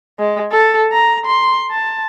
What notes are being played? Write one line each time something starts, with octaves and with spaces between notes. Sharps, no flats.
G#3
A4
A#5
C6
A5